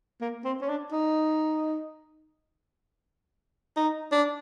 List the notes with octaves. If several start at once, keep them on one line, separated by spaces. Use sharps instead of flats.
A#3
C4
C#4
D4
D#4
D#4
D4